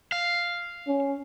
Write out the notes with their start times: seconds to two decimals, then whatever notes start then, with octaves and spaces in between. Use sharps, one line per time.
0.12 F5
0.87 C#4